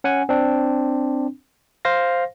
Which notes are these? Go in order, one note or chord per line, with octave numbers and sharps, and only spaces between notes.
C#4 F#5 G#5
C4 D4
C5 F5 A#6